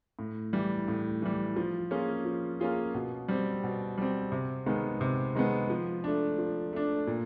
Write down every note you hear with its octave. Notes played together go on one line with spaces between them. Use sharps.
A2
E3 G3
A2
E3 G3
F3
A#3 C#4 F4 G#4
F3
A#3 C#4 F4 G#4
B2
G3 C4
B2
G3 C4
C3
D#3 G#3 B3
C3
D#3 G#3 B3
F3
A3 D4
F3
A3 D4
A#2